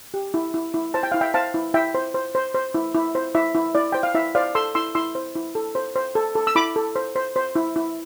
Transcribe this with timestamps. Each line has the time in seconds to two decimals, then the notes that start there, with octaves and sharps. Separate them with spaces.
0.14 G4
0.34 E4
0.54 E4
0.74 E4
0.94 C5 A5
1.03 G5
1.12 E4 F5
1.21 E5 G5
1.34 C5 F5 A5
1.54 E4
1.74 E4 E5 G5
1.95 C5
2.14 C5
2.35 C5
2.55 C5
2.74 E4
2.95 E4
3.15 C5
3.35 E4 E5
3.55 E4
3.75 E4 D5
3.92 C5 G5
4.03 F5
4.15 E4 E5
4.35 C5 D5 F5
4.55 A4 C6 E6
4.75 E4 C6 E6
4.95 E4 C6 E6
5.15 C5
5.36 E4
5.55 A4
5.75 C5
5.95 C5
6.15 A4
6.35 A4
6.47 E6
6.55 E4 B5 D6
6.76 A4
6.96 C5
7.16 C5
7.36 C5
7.56 E4
7.76 E4